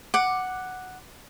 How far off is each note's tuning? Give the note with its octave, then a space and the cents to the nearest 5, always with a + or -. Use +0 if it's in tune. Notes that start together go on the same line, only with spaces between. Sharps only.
F#5 +0 D6 +10